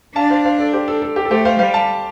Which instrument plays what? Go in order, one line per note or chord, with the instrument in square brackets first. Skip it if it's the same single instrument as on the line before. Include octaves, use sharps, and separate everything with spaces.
[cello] D4 [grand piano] F5 A5
[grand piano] C5 F5
C5 F5
A4 D5
G4 C5
A4
A4
G4
A4
[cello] A3 [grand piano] G4 C5
[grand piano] C5 F5
[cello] G3 [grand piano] C5 F5
[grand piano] F5 A5